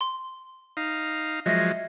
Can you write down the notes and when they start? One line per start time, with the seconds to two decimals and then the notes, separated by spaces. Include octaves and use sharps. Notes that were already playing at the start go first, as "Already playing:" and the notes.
0.01 C6
0.77 D#4 F5
1.46 F3 F#3 G#3 D#5 E5 A#6